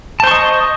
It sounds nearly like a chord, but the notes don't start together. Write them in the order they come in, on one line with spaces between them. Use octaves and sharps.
A5 C5 C#6 D#5